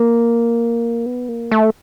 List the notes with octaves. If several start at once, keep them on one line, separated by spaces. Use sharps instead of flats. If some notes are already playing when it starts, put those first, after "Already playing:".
Already playing: A#3
B3
A#3
A3